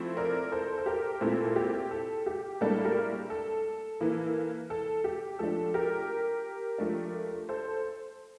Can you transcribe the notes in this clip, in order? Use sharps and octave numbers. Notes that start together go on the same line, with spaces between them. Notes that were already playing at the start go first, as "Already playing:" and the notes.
Already playing: F3 A3 C4 E4
A#4 D5
A4 C5
A4
G4 A#4
A#2 A3 C4 E4 A4
G4
A4
G4
A2 G3 A#3 D4 A4
G4 A#4
A4
E3 A#3 E4
A4
G4
F3 A3 D4 A4
G4 A#4
F3 A3 D4
A4 C5